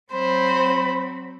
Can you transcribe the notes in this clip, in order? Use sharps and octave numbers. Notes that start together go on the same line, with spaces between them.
F#3 C4 C5 B5